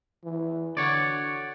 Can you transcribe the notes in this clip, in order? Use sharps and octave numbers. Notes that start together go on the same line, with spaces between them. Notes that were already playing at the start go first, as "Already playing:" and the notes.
E3
D3 F#4 C#5 D5